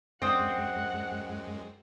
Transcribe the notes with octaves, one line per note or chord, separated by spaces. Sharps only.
F#2 G#3 C4 D5 F#5 G5 D#6